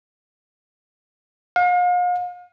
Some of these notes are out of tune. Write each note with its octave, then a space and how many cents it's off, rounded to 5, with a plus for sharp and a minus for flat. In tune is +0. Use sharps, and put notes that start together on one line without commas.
F5 +40